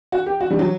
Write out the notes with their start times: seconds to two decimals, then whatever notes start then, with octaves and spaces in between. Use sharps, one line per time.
0.12 F#4
0.26 G4
0.41 F#4
0.50 G3
0.59 F#3